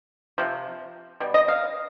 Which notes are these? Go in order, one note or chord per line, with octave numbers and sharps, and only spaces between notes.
C3 F3
B2 G3
D#5
F5